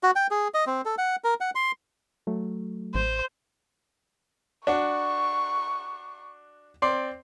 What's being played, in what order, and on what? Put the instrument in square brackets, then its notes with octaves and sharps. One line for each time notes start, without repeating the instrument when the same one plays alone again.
[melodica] F#4
G5
G#4
D#5
C4
A4
F#5
A#4
F#5
C6
[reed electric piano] F#3 A3
[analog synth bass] A1 [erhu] C5
[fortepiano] D4 F#4 [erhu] C#6
[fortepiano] C4 D5 C6